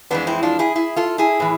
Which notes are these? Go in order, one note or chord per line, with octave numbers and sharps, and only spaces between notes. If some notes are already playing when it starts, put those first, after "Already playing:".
F2 E3 G#3 B3 D4
C4 E4
D4 F4
E4 G#4
E4 G#4
F4 A4
E4 G#4
A2 E3